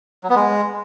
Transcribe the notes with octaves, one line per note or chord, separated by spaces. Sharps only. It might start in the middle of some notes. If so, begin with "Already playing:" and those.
F#3
B3
G#3